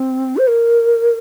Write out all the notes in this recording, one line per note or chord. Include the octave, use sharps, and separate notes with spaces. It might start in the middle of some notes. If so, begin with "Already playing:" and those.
Already playing: C4
C5
A#4